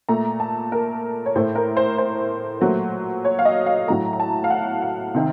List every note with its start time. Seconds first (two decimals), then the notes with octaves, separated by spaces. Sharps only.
0.09 A#2 A3 A#5
0.40 A5
0.72 A#4
1.26 C#5
1.36 A2 A3 C5
1.55 A#4
1.77 C5
1.98 C5
2.61 A#2 F#3 A3
3.25 C#5
3.39 F5
3.45 D#5
3.66 F5
3.88 A2 F#3 A3 A#5
4.13 A#5
4.20 A5
4.44 F5
4.50 F#5
4.82 F5
5.14 C3 D#3